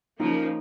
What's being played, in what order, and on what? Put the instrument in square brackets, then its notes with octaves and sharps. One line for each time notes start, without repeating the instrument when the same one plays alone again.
[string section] C#3 F3 A#3 [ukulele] D#4